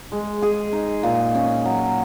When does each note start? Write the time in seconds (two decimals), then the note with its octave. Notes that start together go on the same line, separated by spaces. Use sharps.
0.12 G#3
0.42 G#4
0.73 D#4
1.03 A#2
1.35 C#4
1.65 F#3